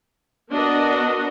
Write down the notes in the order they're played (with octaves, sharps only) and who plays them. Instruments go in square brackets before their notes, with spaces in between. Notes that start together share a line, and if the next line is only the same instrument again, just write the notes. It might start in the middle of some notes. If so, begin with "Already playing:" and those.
[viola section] B3 D4 F#4 A#4 D#5